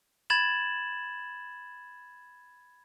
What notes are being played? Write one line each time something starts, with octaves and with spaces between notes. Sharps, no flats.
B5 G#6 A6 E7 F#7